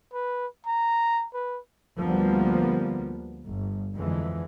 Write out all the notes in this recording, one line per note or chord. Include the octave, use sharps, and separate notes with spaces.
B4
A#5
B4
D2 F3 G3 A#3 B3
G1
F2 D3 E3 G#3